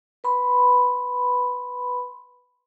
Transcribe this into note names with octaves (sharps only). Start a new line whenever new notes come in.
B4 B5 C6